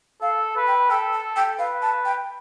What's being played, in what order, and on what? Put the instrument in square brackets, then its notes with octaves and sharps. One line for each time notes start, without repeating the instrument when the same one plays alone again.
[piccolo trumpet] A4 [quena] F5
[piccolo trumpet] B4
[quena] G5
[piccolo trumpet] A4 [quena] G5
[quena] A5
G5
[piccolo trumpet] B4 [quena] F5
[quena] A5
G5